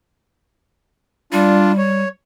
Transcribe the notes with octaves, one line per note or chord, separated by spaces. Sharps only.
G3 D4 F4
C#5